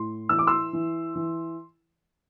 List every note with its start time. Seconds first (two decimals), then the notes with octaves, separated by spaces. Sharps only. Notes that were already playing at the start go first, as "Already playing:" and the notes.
Already playing: A2 C6
0.29 E3 E6
0.39 D6
0.47 C6 E6
0.73 E3
1.15 E3